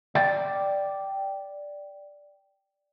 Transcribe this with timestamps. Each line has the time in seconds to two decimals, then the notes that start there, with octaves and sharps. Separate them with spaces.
0.15 D5 G5